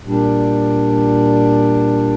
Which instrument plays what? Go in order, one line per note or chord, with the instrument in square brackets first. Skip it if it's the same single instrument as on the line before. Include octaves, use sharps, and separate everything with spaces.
[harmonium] A#2 G3 D4